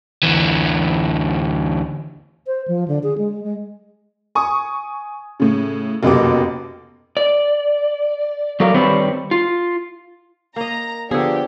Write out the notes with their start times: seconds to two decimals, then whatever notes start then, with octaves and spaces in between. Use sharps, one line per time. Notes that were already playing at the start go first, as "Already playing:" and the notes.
0.23 D2 E3
2.47 C5
2.68 F3
2.88 D3
3.03 G#4
3.18 G#3
3.44 G#3
4.35 G#5 C#6 D#6
5.40 A2 C#3
6.03 F1 F#2 B2 A#3 G4 D6
7.17 D5
8.60 F#3 A4 A#4 D5 F5
8.74 D#3 G3 C4 B4 C#5 D5
9.31 F4
10.56 A#3 D#5 A#5
11.11 D3 F3 B3 D4 G4 G#4